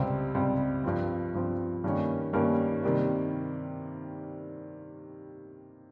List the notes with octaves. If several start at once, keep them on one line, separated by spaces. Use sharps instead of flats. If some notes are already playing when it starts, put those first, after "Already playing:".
Already playing: C#2 C3 G3 C4
C#2 C3 G3 C4
G2 F3 C4
G2 F3 C4
G2 D#3 G3 A#3 C#4
G2 D#3 G3 A#3 C#4
C3 D#3 G3 A#3